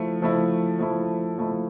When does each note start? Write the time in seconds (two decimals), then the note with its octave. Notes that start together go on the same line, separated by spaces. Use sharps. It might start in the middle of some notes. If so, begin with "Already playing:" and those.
Already playing: F3 A3 E4
0.22 F3 A3 E4
0.79 F3 A3 E4
1.38 F3 A3 E4